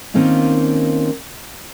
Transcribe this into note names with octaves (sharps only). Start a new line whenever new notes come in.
D#3 A#3 C4 C#4 D#4 F4